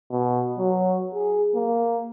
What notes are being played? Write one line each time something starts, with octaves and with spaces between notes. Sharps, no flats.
B2
F#3
G#4
A#3